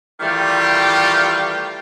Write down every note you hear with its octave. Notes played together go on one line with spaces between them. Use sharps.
D#3 E3 G3 A3 F4 G4